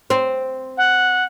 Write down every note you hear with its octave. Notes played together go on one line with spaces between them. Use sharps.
C4
F#5